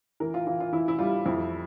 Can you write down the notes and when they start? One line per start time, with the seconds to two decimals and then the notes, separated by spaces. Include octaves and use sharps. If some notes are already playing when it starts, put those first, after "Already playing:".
0.20 E3 A#4
0.34 F4
0.47 E3 F4
0.60 F4
0.73 E3 E4
0.88 E4
0.99 G3 F4
1.26 F2 E4